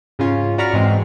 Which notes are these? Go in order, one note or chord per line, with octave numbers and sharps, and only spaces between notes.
G#2 C#3 C#4 F4
F#4 D5 A#5 B5 C#6 F6
G#2 E3 G#3 C4